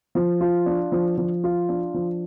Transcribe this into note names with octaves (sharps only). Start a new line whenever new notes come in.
F3
F4
D4
F3
F3
F4
D4
F3